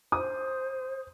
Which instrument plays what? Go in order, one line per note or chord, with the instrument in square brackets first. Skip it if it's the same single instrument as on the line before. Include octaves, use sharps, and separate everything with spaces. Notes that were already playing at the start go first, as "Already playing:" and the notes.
[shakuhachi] C5 [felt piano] D#6